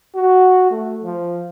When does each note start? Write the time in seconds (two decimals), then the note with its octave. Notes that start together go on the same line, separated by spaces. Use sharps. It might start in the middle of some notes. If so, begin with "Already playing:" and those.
0.15 F#4
0.71 A3
1.04 F3